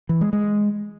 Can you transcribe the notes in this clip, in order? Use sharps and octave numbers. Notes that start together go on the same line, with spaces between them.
E3
G#3
G#3